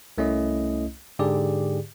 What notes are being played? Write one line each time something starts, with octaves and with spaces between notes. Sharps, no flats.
C2 A3 C#4 E4 D#5
G#2 D3 G4 G#4 D5